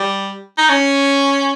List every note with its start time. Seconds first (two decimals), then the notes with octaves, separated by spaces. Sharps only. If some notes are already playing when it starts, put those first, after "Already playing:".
Already playing: G3
0.58 D#4
0.70 C#4